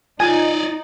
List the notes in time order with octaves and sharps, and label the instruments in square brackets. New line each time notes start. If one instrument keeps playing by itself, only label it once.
[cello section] D#4 [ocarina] F4 [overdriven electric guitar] D5 D#5 [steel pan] G#5